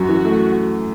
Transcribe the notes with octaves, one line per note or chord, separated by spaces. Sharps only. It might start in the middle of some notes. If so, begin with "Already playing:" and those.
Already playing: F#2 F#4
E3
A3